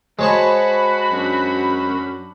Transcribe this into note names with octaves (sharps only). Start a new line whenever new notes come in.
G#3 F#4 C5 C#5 A5 B5 D#6
F#2 D4